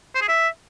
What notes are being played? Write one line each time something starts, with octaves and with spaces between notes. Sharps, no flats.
C5
G#4
E5